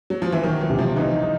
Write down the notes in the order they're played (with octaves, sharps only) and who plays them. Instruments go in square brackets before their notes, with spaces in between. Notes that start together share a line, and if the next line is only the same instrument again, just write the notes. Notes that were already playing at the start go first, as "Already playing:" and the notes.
[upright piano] F#3
F3
E3
[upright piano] D#3 [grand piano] F#3
[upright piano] E3
[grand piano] C3
[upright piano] F3
[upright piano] E3 [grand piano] D#4
[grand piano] D#4